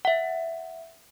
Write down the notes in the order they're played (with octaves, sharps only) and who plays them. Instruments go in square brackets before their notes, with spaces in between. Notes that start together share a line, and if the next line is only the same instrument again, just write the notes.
[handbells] E5 F#5